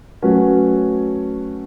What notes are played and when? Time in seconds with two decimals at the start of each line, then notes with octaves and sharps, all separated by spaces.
0.22 F#3 A3 C#4 F#4 B4